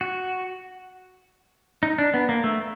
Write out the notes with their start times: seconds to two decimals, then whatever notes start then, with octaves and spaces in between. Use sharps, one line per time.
0.01 F#4
1.83 D#4
1.98 D4
2.14 B3
2.29 A#3
2.44 A3